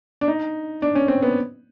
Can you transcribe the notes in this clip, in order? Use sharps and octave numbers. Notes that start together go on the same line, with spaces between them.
D4
D#4
D4
C#4
C4
B3